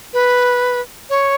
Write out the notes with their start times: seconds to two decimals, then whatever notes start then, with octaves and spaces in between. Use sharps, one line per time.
0.13 B4
1.10 C#5